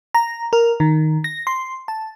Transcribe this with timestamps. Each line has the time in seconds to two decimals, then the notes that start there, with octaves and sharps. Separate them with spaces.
0.14 A#5
0.53 A#4
0.80 D#3
1.24 A#6
1.47 C6
1.88 A5